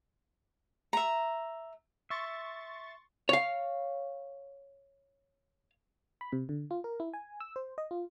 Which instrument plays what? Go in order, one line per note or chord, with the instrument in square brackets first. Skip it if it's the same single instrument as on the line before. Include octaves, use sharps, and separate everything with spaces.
[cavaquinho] E5 A#5
[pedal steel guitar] E5 [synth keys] C6 C#6 A6
[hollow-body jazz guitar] C#5 F5
[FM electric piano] B5
C3
D3
F4
A#4
E4
G#5
E6
C5
D#5
F4